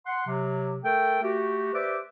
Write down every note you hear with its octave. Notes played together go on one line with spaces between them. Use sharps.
F#5 C6
C3 F#3
A3 A4 A#4 G5
A3 F#4 G4
G4 B4 C5 D5 E5 D6